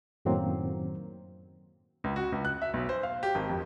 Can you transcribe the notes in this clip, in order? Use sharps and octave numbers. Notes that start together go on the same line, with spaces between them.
F#2 A2 D#3 F#3 A#3 C4
C#2
F#4
C#2
F#6
E5
B1
C5
F5
G4
G#1
F2